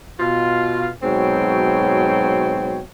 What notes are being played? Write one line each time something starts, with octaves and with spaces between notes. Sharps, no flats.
B2 F4
G#2 B2 F#3 C4 C#5 G5